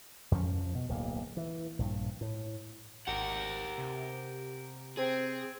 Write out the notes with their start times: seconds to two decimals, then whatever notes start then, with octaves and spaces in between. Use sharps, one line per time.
0.31 F2 F3 C#4
0.75 B2
0.88 D1 B1 A#3
1.37 E3
1.79 A#1 G2
2.21 A2
3.08 G#1 G4 A#4 F#5
3.78 C3
4.97 C4 G#4